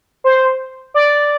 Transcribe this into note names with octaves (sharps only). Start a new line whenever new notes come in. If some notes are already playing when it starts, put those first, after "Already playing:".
C5
D5